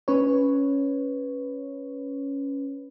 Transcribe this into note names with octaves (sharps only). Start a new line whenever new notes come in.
C#4 B4 C#5